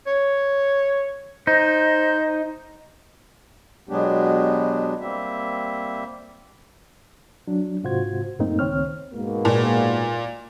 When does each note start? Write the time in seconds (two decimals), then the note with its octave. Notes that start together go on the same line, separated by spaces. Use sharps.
0.07 C#5
1.47 D#4 C5
3.89 B2 F#3 G#3 B3 D4 G4
5.01 G3 A#3 C4 E5
7.48 F#3 D4
7.84 G#2 C3 F4 F#4 C5 G#6
8.39 F#2 A2 A3 A#3 C4 D#4
8.59 C#2 D#3 C4 C#5 F6
9.13 G#2 B2 A#3
9.45 A#2